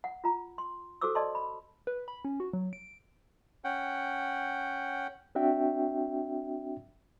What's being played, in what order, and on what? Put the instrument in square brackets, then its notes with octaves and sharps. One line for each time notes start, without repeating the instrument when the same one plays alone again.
[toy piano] F#5
F4 A#5
C6
F#4 A4 C5 D6 E6
D5 D#5 A5 C6
B5
[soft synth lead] B4
B5
C#4
F#4
F#3
D7
[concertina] C#4 F#5 G5
[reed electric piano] C4 D4 F#4 E5 G5